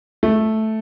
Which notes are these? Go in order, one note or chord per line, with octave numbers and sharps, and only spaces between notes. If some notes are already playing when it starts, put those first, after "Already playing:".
A3